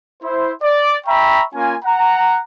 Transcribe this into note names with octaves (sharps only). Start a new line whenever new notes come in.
E4 C5
D5
E5 G5 A#5 B5 C#6
A#3 C#4 F4 G#5
F#5 A#5